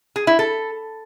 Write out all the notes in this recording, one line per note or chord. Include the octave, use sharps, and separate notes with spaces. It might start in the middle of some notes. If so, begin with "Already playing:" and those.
G#4
E4
A4